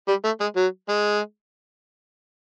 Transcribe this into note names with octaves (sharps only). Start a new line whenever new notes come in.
G3
A3
G#3
F#3
G#3